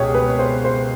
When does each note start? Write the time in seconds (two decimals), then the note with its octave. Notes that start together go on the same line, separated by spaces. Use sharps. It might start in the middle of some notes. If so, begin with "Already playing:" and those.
Already playing: C#2 B2 G4 G#4 C#5
0.15 B4
0.39 C5
0.64 C5